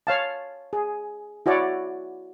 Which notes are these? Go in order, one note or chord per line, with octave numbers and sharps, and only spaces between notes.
C#5 F5 A5
G#4
E4 F#4 C#5 D5